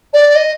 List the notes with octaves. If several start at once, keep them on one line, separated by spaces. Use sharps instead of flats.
D5
D#5